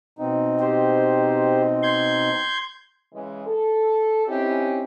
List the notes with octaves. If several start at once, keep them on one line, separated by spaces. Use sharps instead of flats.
B2 C4 D#4
G4 C5
C6 G6 G#6
C#3 E3 G#3
A4
C4 C#4 D#4 E4 G4